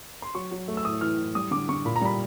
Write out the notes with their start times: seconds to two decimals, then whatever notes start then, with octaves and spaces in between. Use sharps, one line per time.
0.22 C6
0.34 F#3 C#6
0.51 F#3
0.68 A3
0.77 E6
0.85 A2 D#6
1.01 E3 F6
1.18 A2
1.35 G3 D#6
1.51 D3 D6
1.69 D3 C#6
1.85 A#2 B5
1.96 A#5
2.01 G3 B5